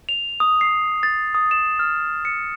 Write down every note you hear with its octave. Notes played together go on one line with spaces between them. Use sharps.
F7
D#6
C7
A6
D#6
E7
F6
C#7